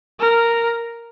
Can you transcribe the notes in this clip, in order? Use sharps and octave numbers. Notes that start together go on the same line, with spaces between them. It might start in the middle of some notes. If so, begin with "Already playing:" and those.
A#4